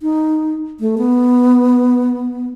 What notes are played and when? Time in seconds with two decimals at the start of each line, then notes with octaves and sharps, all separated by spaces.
0.01 D#4
0.80 A3
0.98 B3